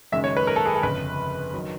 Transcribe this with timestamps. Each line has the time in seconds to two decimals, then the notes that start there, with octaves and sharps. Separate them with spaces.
0.12 F#1 F#2 D#3 G#3 E5
0.24 C#5
0.37 B4
0.47 A#4
0.56 A4
0.66 G#4
0.74 A4
0.83 G1 F2 C#3 B4
1.53 D#3 F#3